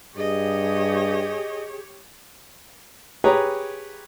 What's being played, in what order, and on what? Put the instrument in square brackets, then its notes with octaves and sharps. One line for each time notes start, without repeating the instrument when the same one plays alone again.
[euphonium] G2 [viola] G4 C#5 [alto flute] G#4 [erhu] D#5
[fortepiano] G4 G#4 B4 C#5 A#5